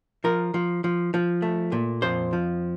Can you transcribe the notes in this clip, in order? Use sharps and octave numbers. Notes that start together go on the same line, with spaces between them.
F3 A#4
F3
F3
F3
A3
A#2
F2 C5
F3